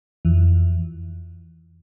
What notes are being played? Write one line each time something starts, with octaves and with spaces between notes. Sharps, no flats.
F2 E3